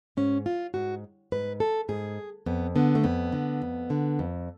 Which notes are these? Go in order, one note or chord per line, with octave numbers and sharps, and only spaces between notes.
G#2 C#4
F4
G#2 F#4
G#2 B4
A4
G#2 G#4
F2 B3
D3 B3
A3
F2 B3
D3
F2
D3
F2